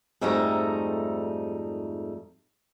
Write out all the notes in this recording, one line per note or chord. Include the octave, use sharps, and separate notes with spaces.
F2 G#2 G3 A3 D#4 A#5